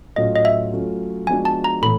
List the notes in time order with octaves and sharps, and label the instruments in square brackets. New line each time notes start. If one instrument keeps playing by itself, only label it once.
[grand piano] A2 F#3 A3 C#4 F4 [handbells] D#5
[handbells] D#5
E5
[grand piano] F#3 A3 C#4 F4
[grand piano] F3 G#3 B3 D4 F#4 [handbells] G#5
[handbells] A5
A#5
[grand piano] A2 E3 [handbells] B5